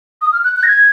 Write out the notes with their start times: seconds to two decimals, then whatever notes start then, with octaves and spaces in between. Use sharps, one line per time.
0.22 D#6
0.33 F6
0.44 F#6
0.56 F#6
0.63 A#6
0.68 G#6